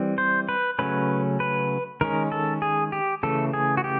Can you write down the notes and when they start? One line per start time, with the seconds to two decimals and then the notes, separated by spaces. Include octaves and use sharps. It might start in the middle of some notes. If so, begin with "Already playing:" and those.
Already playing: E3 G3 C4
0.18 C5
0.49 B4
0.79 C#3 F#3 A3 C#4 B4
1.40 B4
2.01 D#3 G#3 C#4 A#4
2.32 A4
2.62 G#4
2.92 G4
3.23 C#3 E3 A3 A4
3.54 G#4
3.77 F#4
3.84 G4